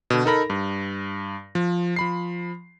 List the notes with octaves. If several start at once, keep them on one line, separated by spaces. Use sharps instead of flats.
B2 D3
D#4 A4 A#4 B5 A#6
G2
F3
F3 B5 C7